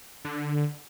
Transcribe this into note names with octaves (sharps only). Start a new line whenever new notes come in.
D3